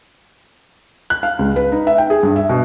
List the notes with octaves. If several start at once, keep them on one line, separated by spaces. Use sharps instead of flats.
F#6
F5
C#2
B4
D#4
E5
G5
G#4
G2
E5
B2